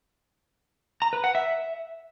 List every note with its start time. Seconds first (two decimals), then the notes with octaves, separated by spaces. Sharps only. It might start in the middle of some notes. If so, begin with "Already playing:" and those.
1.02 A#5
1.13 B4
1.24 F#5
1.35 E5